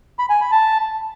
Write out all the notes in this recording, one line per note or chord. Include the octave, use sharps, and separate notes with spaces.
B5
G#5
B5
A5